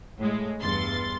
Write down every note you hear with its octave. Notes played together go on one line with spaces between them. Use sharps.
A2 G#3
E2 G2 C6 A6